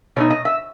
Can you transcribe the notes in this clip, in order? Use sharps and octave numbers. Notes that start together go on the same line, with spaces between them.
B2 A3 D#4 C#5
D#5
E5